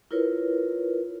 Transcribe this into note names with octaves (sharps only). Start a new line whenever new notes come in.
E4 F4 A#4 B4 C#5